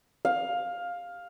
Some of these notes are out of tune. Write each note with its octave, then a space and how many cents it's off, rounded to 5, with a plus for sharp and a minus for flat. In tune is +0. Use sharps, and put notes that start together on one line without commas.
F5 +10